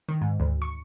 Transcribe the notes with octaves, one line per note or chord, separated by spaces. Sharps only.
D#3
G#2
D2
C#6